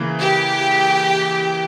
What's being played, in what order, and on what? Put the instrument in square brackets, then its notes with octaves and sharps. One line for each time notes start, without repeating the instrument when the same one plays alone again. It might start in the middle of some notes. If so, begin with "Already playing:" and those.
Already playing: [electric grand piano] C#3 E3 A#3
[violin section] G4